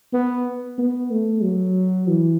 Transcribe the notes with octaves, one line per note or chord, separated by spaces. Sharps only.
B3
B3
A3
F#3
E3